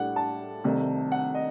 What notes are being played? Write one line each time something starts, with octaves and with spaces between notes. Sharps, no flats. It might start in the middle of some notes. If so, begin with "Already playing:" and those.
Already playing: A2 G3 D4 F#5
A5
C2 C3 D#3 A3
F#5
D#5